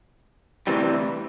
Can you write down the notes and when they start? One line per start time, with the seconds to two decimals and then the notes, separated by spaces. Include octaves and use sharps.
0.67 D2 C3 E3 G3